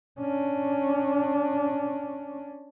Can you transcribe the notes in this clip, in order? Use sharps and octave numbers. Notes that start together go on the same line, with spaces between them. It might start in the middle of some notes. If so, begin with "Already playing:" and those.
C#4 D4